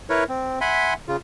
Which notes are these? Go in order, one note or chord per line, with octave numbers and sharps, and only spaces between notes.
E4 A#4 B4 C#5
C4
E5 F#5 G#5 B5 C6
C#3 F4